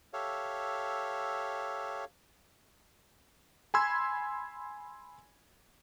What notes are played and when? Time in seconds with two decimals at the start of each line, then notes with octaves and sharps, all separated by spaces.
0.13 G4 A4 C#5 E5 F5
3.74 G#5 B5 C6 E6 G#6